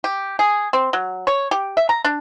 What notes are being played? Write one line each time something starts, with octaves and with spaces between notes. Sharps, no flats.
G4
G#4
C4
F#3
C#5
G4
E5
A#5
D4